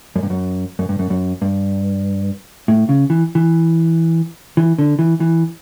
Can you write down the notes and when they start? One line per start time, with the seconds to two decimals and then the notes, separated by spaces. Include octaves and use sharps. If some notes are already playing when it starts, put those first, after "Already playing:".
0.16 F#2
0.23 G2
0.30 F#2
0.79 F#2
0.89 G2
0.99 F#2
1.10 F#2
1.42 G2
2.68 A2
2.89 C#3
3.10 E3
3.35 E3
4.57 E3
4.79 D3
4.99 E3
5.20 E3